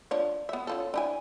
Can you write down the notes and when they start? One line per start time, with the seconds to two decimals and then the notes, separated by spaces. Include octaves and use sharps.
0.11 F3 D4 C#5
0.49 B3 E5
0.67 C#4 F4 A4
0.94 D4 E4 G#5